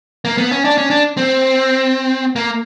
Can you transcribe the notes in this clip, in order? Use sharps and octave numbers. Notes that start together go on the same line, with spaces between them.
A#3
B3
C#4
D4
C#4
D4
C4
A#3